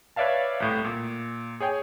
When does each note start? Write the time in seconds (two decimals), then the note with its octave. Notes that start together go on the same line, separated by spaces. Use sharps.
0.16 B4 C#5 D5 E5 F5 A5
0.60 C2 A2
0.84 A#2
1.60 G#4 C#5 G5 G#5